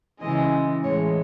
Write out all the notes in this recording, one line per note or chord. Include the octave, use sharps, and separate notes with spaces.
C#3 E3 G#3 D#5
A2 E3 G#3 C#5